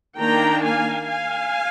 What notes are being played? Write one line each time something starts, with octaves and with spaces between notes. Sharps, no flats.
D#3 A#3 D4 G5 A#5
F5 G#5
F5 G#5